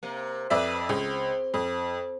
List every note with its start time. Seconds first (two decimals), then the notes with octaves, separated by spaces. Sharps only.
0.03 C3 A#3
0.50 F2 B4 C5 D5 E5
0.89 C#2 C4
1.54 F2